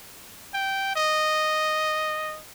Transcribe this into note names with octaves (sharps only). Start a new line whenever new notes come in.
G5
D#5